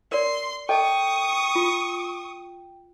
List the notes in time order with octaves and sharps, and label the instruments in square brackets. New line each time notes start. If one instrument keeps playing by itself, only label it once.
[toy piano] A#4 D5 [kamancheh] C6
[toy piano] A4 D#5 A5 [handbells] G5 [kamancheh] C#6 D#6
[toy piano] F4